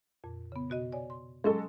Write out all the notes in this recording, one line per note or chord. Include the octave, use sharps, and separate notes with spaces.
F2 A#2
C#3 B3
B2 F#4 D#5
C#5 D5 G#5
C6
F#3 G#3 C#4 G#4 A4